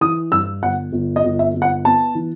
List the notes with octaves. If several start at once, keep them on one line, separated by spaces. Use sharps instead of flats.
E3 D#6
G2 E6
G1 F#5
G1
D#5
G1
E5
G1
F#5
B3 A5
E3